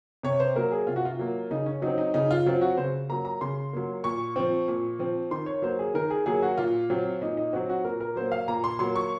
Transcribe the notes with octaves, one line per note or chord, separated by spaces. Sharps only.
C3 C#5
C5
F#3 A#3 A#4
G#4
C3 F4
F#4
F4
F#3 A#3
C#3 D#4
C#4
F#3 C4 D#4
D#4
C#3 D#4
F4
F#3 C4 F4
F#4
C#3 C5
F#3 A#3 A#5
A#5
C#3 C6
F#3 A#3
A#2 C#6
F3 C4
A#2
F3 C4
D#3 C6
C#5
F#3 A#3 C5
G#4
D#3 A#4
G#4
F#3 A#3 G#4
F#4
A#2 F4
F#3 C4
A#2 D#4
D#4
F#3 C4 F#4
F#4
A#2 A#4
A#4
F#3 A#3 C5
F5
A#2 A#5
C6
F#3 A#3 C6
C#6